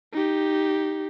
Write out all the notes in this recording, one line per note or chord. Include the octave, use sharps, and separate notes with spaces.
D#4 G4